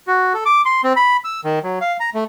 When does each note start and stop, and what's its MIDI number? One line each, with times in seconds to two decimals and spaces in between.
0.08 0.33 66
0.34 0.44 69
0.46 0.62 86
0.65 0.81 84
0.84 0.93 60
0.96 1.17 83
1.24 1.40 88
1.44 1.59 51
1.64 1.79 54
1.81 1.97 77
2.00 2.10 82
2.14 2.24 57